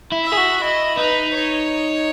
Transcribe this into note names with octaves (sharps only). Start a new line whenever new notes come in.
E4
E5
G#4
F#4
E4 D#5
D#4 B4
C#5